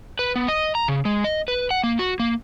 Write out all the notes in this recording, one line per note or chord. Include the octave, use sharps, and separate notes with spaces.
B4
B3
D#5
A#5
C#3
G#3
D#5
B4
F#5
A#3
F#4
A#3